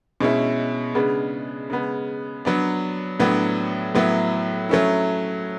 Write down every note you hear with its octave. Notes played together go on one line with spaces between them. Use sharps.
B2 G#3 C#4 E4
C#3 G#3 B3 D4
C#3 G#3 B3
F#3 B3 D4
A2 F#3 B3 D4
A2 F#3 B3 E4
F#3 A3 C#4 E4